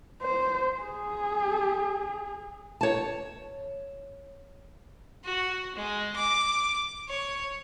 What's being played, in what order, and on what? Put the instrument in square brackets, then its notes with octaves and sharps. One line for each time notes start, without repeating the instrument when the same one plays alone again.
[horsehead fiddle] C5
G#4
[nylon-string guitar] C#5 A5
[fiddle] F#4
G#3
D6
C#5